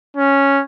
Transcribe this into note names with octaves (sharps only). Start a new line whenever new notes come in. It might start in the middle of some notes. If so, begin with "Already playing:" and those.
C#4